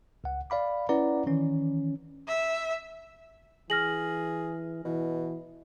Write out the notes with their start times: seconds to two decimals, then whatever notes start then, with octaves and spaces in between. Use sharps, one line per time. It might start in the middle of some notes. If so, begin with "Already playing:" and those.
0.24 C#2 F#5
0.50 D5 F5 B5 D6
0.89 C#4 E4 B4 D5 F#5 A#5
1.26 D#3 E3 C#4
2.28 E5
3.70 E3 G#4 F6 A#6 F#7
4.85 B2 E3